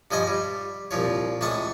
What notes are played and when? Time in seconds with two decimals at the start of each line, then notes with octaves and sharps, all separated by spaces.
0.11 G2 F3 D#5 G#5 C#6
0.27 G3
0.91 C2 A#2 F3 C#5
1.41 C#2 A2 E3 A5 C#6 D#6